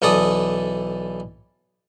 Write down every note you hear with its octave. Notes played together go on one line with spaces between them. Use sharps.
B1 E3 A4 D5 D#6